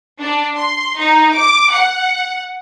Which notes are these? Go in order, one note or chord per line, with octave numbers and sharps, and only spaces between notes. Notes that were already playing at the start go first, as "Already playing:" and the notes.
D4
C6
D#4
D6
F#5